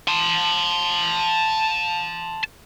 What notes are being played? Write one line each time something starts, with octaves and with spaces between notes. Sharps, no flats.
A5 C6